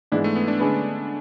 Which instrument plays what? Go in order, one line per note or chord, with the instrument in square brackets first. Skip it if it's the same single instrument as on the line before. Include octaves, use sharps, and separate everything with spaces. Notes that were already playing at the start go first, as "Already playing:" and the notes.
[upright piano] G#2 E3 G#3 B3 D4 [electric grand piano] E4
[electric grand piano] A3
B3
D4
[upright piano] D3 G#3 C#4 G#4 B4